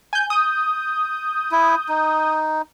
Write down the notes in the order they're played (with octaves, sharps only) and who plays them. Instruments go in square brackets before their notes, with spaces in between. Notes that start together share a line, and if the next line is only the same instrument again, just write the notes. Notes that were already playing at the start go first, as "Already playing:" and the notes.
[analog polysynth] G#5 G6
D#6 G6
[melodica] E4
D#4